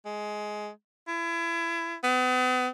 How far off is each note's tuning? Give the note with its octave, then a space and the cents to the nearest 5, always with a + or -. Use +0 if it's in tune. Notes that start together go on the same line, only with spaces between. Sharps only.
G#3 +15
E4 +30
B3 +40